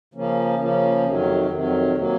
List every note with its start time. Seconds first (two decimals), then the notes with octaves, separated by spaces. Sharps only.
0.14 C#3 F3 A#3 C#4
0.59 C#3 F3 A#3 C#4
1.04 F2 C3 D#3 F#3
1.50 F2 C3 D#3 F#3
1.95 C3 F#3 A#3